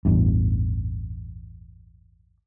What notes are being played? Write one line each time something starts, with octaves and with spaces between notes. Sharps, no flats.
A1 E2 G2